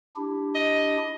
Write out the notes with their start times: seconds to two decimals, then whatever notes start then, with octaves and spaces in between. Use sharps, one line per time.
0.16 D4 E4 G4
0.55 D#5